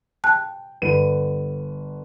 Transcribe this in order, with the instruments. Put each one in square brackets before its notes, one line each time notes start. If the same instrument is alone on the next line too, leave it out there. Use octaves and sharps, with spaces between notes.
[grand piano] G5 [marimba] A5 F#6
[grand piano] G1 B4 D#7